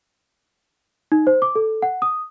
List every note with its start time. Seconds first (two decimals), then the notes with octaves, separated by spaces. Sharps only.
1.12 D#4
1.27 C5
1.42 D6
1.55 A4
1.82 F#5
2.02 D#6